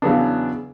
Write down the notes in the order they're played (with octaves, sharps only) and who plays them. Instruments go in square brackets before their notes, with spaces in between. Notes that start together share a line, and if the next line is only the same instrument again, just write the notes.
[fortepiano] E2 C#3 F#3 B3 D4